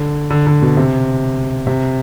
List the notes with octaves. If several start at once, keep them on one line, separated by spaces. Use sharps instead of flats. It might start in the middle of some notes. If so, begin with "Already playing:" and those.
Already playing: D3
D3
D3
B2
C3
C3